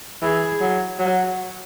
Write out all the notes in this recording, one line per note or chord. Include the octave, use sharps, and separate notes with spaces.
E3 G#4
F#3
F#3